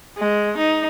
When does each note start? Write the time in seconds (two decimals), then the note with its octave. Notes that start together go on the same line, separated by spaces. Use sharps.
0.17 G#3
0.58 D#4